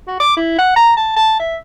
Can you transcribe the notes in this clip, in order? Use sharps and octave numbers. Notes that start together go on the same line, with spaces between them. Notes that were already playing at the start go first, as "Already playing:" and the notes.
F#4
D6
E4
F#5
A#5
A5
A5
E5